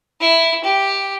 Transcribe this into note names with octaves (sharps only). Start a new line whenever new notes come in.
E4
G4